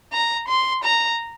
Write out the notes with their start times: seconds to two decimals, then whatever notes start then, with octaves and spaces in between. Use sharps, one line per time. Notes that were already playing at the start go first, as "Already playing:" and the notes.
0.12 A#5
0.48 C6
0.84 A#5